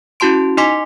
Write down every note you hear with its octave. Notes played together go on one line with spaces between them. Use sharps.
C#4 E4 F#4 A5 C6 D7
D#4 D#5 G#5 C6 D6 B6